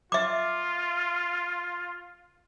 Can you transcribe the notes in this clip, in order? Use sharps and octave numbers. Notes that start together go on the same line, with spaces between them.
F4 E5 D6